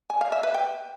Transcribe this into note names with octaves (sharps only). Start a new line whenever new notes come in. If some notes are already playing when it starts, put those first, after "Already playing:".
G#5
F5
E5
B4
G5